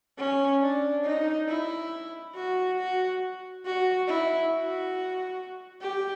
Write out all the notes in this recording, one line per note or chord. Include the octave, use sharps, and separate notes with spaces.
C#4
D4
D#4
E4
F#4
F#4
F#4
E4
F#4
G4